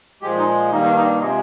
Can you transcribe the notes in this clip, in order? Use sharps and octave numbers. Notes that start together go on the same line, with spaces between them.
A#2 F3 G#3 G4
D#4
G2 D#3 G3 A#3 D#4
D#4
D4
D#4
D4
C3 F3 G#3 D#4